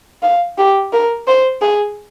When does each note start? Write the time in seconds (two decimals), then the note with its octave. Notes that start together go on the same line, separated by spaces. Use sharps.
0.22 F5
0.58 G4
0.93 A#4
1.27 C5
1.62 G#4